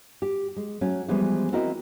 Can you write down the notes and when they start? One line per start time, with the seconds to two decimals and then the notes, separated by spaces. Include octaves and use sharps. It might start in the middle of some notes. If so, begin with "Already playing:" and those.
0.22 G4
0.56 G#3
0.81 F#3 A3 C#4
1.08 E3 F3 G3 G#3 B3
1.52 C4 E4 F#4 A#4 D#5 F#5